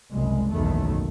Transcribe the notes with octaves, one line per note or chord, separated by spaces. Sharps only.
F#1 C2 G#3
F#1 B1 E2 D#3 A3